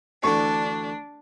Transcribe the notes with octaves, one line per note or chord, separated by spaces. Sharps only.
D2 D3 E3 D4 C#6